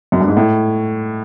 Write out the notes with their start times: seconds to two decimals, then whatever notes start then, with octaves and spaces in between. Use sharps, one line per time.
0.12 F#2
0.20 G2
0.28 G#2
0.37 A2